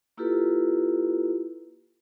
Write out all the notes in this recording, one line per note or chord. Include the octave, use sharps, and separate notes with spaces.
A#3 E4 F4 G4 A4 B4